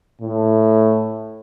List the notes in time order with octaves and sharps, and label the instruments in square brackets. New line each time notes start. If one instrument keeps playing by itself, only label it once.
[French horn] A2